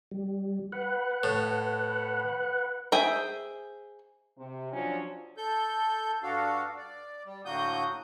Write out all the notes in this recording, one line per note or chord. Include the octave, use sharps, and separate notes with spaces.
G3
B4 F#5
A2
G#4 C5 E5 G5
C3
F3 F#3 C#4 D4
A4 G6
G2 D4 F#4 A4 F5
D5
G3
A2 D3 A#3 F#4 D#6 G6